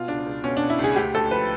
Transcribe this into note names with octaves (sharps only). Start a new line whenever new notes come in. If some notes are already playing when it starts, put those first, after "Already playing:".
Already playing: B2 F4
C#2 D4
C#2
B2 C#4
D4
B2
E4
C#2 G#4
D2 G4
D2 A4
F3 B4